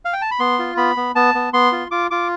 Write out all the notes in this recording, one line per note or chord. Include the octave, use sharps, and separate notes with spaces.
F5
G5
A5
B5
B3 C6
F4
B3 B5
B3
B3 A5
B3
B3 C6
F4
F4 D6
F4 D6